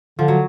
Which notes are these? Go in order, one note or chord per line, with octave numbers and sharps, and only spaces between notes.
D3 F3
F#3